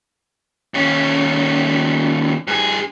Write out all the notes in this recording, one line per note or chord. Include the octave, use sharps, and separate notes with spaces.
D#2 C#4
G2 G#4